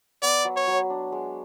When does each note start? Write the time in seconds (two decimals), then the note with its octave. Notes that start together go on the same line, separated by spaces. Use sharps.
0.22 B3 D5
0.45 F#3
0.56 C#5
0.67 F#3
0.90 D4
1.12 G#3